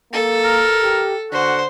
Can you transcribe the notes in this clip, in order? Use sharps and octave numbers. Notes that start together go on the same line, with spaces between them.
A#3 A4
A#4
G4
D3 F#4 C5